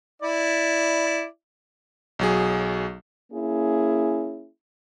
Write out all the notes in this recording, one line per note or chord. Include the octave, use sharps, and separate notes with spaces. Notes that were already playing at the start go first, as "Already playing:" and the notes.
E4 D5
B1 F#3 G#4
A#3 C#4 E4 G#4